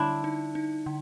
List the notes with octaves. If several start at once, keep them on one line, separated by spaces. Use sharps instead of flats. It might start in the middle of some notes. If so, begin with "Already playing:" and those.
Already playing: D3 G3 D4 E4
D#4
D#4
D3